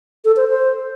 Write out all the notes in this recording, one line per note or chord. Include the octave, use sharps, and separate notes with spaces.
A4
C5
C5